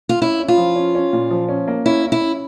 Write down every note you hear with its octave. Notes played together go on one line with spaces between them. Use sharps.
F4
C#4 E4
C#4
F4
F3
C#4
C#4
A#2
F3
C#4
A#3
C#4 E4
C#4
E4
C#4